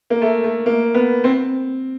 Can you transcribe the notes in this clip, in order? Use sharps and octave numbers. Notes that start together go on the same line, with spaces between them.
A#3
A3
A3
A#3
B3
C4